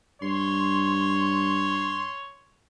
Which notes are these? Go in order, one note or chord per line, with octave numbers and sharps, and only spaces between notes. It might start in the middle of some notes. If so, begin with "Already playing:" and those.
G2 C#5 C6